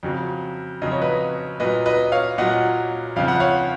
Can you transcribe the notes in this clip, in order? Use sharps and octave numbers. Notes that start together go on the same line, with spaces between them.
F2 C#3 F#3
F2 C#3 F#3 D#5
C#5
B4 D#5
A#2 F#3 B4 D#5
B4 D#5
C#5 F5
A#2 F#3 D#5 F#5
F2 C#3 F3 F5
F#5
C#5 F5